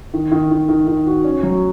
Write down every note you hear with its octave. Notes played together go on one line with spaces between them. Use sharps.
D#3
D#3
D#3
D#3
D#3
F#4
C#4
F#3